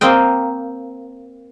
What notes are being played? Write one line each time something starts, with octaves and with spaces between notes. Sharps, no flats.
A#3 C4 C5 D#5 G5